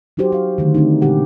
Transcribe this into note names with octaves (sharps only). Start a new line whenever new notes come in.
F#3 D#4 F#4 G4 C5
G4 F5
D3 D#3 A3
D3 A3 C4 D4 D#4
A#2 C#3 G#3 G4 F#5